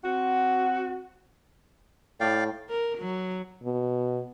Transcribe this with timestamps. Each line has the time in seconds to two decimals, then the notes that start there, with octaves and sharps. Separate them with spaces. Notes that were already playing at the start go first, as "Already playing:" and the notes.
0.04 C4 F#4
2.20 A2 D5 F5 G5
2.69 A#4
2.99 F#3
3.64 B2